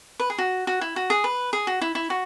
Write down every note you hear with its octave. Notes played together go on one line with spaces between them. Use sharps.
B4
G#4
F#4
F#4
E4
F#4
G#4
B4
G#4
F#4
E4
E4
F#4